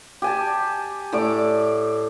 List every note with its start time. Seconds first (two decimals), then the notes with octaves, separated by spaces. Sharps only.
0.22 G4 G#5 A5
1.12 A2 D5 D6